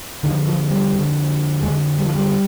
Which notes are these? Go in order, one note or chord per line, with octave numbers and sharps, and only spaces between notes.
F2 D3 D#3
F3
G3
F2 D3
F2 D3 G#3
G3
F3
G3